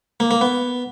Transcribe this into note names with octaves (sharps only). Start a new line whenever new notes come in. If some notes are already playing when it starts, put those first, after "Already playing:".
A#3
A#3
B3